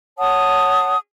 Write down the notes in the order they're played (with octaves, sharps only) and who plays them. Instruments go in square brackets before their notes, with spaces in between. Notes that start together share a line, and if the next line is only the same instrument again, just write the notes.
[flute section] C#5 F#5 A5 D#6